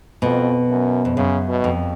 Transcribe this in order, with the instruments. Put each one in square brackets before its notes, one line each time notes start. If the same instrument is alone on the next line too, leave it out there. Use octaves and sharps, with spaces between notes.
[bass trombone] F2 [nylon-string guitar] B2
[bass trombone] F#2
[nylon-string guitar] F2
[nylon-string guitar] F#2 [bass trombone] C#3
[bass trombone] B2
[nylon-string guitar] F2